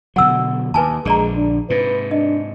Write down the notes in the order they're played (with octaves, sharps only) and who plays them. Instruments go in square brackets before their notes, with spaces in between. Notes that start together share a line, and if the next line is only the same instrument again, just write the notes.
[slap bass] B2 D3 F#3 [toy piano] F#5 E6
[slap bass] D#2 [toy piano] B4 G#5 A5
[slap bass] A#1 D3 [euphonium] G#3 [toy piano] G#4 D5 A#5
[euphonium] D4
[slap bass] G#2 C3 [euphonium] B4
[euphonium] D4 [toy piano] D#5